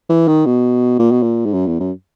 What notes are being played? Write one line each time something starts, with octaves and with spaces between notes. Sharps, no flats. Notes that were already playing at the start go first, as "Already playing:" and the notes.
E3
D#3
B2
A#2
B2
A#2
G#2
F#2
E2
F#2